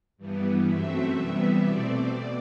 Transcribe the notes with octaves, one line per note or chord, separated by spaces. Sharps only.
G2 E3 G3 B3
F#2 F#3 A3 C4 E5
C3 E3 G3 B3
B2 A3 C4 D5
B2